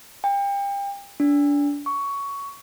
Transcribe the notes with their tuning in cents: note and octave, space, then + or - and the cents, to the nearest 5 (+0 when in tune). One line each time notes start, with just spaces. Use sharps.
G5 +30
D4 -25
C#6 +15